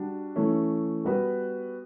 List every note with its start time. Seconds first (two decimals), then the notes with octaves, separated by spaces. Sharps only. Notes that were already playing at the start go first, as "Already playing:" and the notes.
Already playing: G3 D4 F#4
0.36 E3 A3 C#4
1.05 G3 B3 F#4 B4